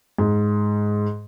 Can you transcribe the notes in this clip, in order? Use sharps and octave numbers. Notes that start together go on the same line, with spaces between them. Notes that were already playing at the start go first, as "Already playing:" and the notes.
G#2